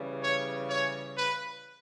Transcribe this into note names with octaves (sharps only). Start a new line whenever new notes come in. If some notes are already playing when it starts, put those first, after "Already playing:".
Already playing: C#3 E3 G3
C#5
C#5
B4